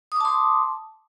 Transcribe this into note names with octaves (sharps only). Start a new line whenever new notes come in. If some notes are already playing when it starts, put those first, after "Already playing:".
A5 C6 D6 D#6